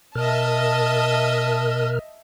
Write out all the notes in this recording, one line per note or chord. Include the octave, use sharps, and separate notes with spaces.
B2 A#4 D#5 E5 A5 F6